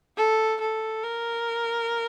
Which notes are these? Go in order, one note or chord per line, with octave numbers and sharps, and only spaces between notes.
A4
A4
A#4